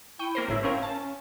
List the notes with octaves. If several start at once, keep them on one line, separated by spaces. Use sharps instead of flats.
E4 G5 C#6 D#7
A#3 A#4 C5
G1 A2 E4 C#5
C4 C#4 A#4 F5
C#4 A5